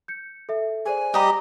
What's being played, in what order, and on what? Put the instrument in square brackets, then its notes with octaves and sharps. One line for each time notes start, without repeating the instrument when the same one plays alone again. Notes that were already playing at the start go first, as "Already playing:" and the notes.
[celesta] G6 C#7
A4 E5
[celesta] G#4 C5 D5 [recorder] G#5
[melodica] G3 G4 D#5 [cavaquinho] A#5 D#6